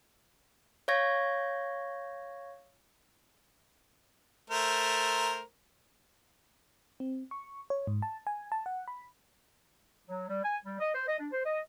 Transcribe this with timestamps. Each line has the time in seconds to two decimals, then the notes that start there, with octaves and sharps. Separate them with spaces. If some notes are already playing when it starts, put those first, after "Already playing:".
0.88 C#5 F5 C#6 G#6 A#6
4.50 A3 A#4 C5
7.00 C4
7.31 C#6
7.70 C#5
7.87 G#2
8.02 A5
8.27 G#5
8.52 A5
8.66 F#5
8.88 B5
10.08 F#3
10.29 G3
10.44 G#5
10.65 G3
10.80 D#5
10.95 C5
11.08 D#5
11.19 D4
11.32 C5
11.46 D#5